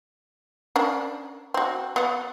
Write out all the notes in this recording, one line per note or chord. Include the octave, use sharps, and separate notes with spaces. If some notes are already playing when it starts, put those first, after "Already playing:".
C#4 D4 A#4
C4 F#4
B3 F#5